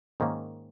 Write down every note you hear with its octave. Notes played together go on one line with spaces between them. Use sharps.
G#2 D#3 A#3 C#4